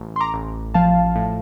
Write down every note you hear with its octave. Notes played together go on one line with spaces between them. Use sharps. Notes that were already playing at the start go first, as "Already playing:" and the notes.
Already playing: A1
C6
A#5 D6
A1
F3 F5 A5
A2